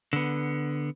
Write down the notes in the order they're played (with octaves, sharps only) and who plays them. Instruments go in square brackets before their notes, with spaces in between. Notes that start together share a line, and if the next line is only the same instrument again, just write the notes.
[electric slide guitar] D3 B3